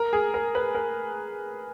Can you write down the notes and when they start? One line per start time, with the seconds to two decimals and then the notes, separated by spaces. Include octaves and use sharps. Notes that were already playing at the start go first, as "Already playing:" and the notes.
Already playing: A#4
0.13 G#4
0.34 A#4
0.55 B4
0.75 A#4